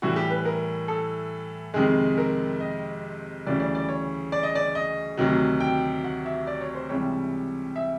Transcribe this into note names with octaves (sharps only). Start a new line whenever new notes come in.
A2 E3 G3 F#4
G4
B4
A#4
A4
F2 C3 D#3 G#3 G#4
A#4
D#5
D2 C#3 E3 G3 D5
D5
D5
C#5
D5
D#5
D5
D#5
D2 C3 D#3 F#3
G5
F#5
E5
D5
C#5
C5
C#2 C3 E3 G3 C#5
E5